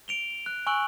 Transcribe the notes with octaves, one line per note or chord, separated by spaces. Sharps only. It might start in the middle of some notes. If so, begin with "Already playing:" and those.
D7 F7 G7
F#6
G#5 C#6 E6 F#6 D7 F#7